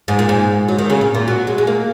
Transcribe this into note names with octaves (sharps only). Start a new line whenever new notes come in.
G#2
A#2
G#2
F#3
D#3
C#3
A#2
A#2
F#3
G#3
G#3
A#3